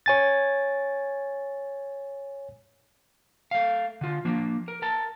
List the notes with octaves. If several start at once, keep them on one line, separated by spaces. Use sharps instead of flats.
C#5 G#5 A6
A3 F5
D3 F4
F3 A#3 D4
A#4
A#4 A5